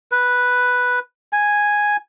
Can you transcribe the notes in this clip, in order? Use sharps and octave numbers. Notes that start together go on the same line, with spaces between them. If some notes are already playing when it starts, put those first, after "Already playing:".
B4
G#5